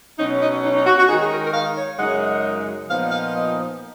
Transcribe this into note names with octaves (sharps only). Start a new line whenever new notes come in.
B2 F#3 C#4 D#4
D#4
D#4
D#4
F#4
F#4
D#3 G#3 D#4 G#4
G#4
A#4
A#4
F5
C#5
F#2 C#3 G#3 D#4 F#5
A#2 F3 B3 D#4 F5
F5
D#5